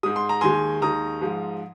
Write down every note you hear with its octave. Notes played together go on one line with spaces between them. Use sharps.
G#2 G#3 D#6
C6
A#5
D#2 D#3 G#3 G#5 C6
D#2 D#3 G#3 A#5 D#6
G#2 F3 G#3